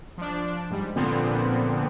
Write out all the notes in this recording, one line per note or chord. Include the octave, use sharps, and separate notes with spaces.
F3 D4
G#2 G3
A#2 D3 F3 B3 C4